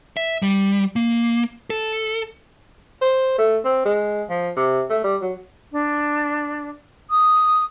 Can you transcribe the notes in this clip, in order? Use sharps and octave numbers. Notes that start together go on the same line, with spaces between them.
E5
G3
A#3
A4
C5
A3
C4
G#3
F3
C3
A3
G3
F#3
D4
D#6